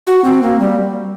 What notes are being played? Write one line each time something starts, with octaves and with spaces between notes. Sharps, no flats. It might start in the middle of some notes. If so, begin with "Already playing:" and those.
F#4
C4
A#3
G3